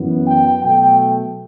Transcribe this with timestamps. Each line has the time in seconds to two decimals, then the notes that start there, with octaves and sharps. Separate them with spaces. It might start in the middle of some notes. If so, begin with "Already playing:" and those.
Already playing: F#2 E3 B3
0.27 G5
0.63 B2 F#3 A3 G5